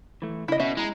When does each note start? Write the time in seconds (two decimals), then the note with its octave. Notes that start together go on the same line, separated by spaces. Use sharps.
0.22 E3 A3
0.48 C#3 E4 D#5
0.60 B2 C#4 E5
0.77 G#3 E4 A#5